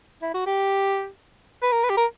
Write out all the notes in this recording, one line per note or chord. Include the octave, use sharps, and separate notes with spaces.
E4
F#4
G4
B4
A#4
B4
G4
A#4